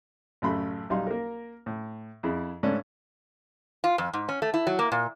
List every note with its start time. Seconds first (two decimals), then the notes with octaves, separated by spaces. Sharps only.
0.42 A1 F#2 C#3 A3 B5 C6
0.90 B1 G3 D#4 F5 C6
1.07 A#3 A#4
1.66 A2
2.23 F2 E4 G#4
2.63 G#2 C#3 A3 C#4 D4
3.84 F4
3.98 F2
4.14 G#2
4.29 C#4
4.42 A3
4.54 E4
4.67 F#3
4.79 A#3
4.92 A#2